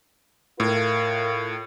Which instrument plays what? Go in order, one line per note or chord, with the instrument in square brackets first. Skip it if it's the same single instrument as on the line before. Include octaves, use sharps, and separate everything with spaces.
[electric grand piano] A2 [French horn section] F4 A#4